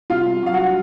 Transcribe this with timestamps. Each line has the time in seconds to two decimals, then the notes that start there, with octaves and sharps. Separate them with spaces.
0.10 C3 F4 F5
0.26 C3
0.43 F#3 F5
0.53 F#4 F#5
0.59 F#3